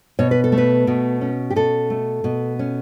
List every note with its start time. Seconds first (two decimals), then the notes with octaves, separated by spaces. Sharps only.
0.19 B2 C#5
0.31 B4
0.44 A4
0.52 A3
0.58 B4
0.87 B2
1.21 C#4
1.50 G4
1.56 B2 A4
1.90 A3
2.24 B2
2.59 C#4